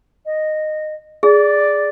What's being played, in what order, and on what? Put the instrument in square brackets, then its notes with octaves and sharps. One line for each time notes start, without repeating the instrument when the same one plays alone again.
[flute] D#5
[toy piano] G#4 [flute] D5